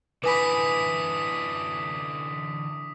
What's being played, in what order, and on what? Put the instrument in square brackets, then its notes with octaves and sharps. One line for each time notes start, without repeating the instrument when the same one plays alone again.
[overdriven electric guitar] D3 E3 [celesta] B4 G#5 B5 [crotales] D6 D#6 B6